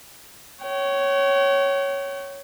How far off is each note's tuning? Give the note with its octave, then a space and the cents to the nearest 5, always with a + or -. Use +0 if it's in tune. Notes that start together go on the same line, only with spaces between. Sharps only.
C#5 +0 G5 -45